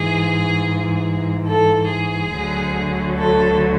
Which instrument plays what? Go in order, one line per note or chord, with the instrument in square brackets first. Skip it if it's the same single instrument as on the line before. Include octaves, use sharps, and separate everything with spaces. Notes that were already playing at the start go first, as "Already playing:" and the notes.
Already playing: [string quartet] G#2 E3 G#4
A4
G#4
D2 D3 F#3
A4